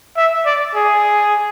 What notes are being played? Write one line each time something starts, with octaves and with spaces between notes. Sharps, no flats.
E5
D5
G#4